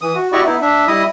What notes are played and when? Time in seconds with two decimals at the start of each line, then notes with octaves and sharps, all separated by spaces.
0.01 E3 D#6
0.15 F#4
0.33 E4 F#4 G4 D5 D#5 C#6
0.46 B3 D#4 E4
0.62 D4 E5
0.88 G3 E4 D#5 D#6